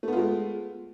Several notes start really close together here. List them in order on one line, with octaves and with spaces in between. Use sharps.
A3 B3 F4 G#3